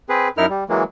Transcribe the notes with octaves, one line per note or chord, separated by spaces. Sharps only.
C4 G#4 B4
F#2 D#4 E4 A#4 F6
G3
E3 F#3 G#3 A#3